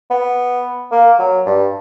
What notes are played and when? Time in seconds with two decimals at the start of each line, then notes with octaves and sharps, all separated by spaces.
0.10 B3
0.92 A#3
1.19 F#3
1.46 G2